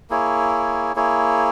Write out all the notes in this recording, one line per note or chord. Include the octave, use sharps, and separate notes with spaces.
A#3 E4 G#4 C#5
A#3 E4 G#4 C#5